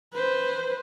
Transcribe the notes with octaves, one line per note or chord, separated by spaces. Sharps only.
B4 C5